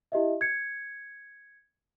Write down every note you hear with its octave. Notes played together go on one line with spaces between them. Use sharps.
E4 G4 D#5 E5
G#6 C#7